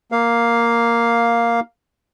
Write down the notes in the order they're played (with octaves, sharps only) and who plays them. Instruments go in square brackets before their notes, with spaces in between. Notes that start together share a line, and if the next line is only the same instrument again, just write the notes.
[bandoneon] A#3 F5